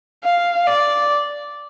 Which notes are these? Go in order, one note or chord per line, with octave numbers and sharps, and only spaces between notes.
F5
D5